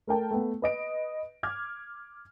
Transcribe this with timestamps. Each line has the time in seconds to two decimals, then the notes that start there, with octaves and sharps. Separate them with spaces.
0.07 A3 A#4 G5 A5
0.31 A3 B3
0.62 B4 D#5 D7
1.43 D6 F6 G#6